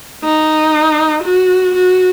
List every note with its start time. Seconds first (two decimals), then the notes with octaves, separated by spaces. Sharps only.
0.24 D#4
1.23 F#4
1.74 F#4